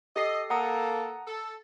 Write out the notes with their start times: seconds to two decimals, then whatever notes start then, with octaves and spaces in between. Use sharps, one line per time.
0.16 G4 A4 D#5 C7
0.50 A#3 A4 F#5 A#5 D#6
1.28 A4